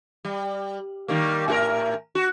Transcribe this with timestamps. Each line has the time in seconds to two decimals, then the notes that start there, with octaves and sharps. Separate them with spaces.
0.25 G3
1.08 D#3 G3 A#3
1.48 A2 F#4 A#4
2.15 F#4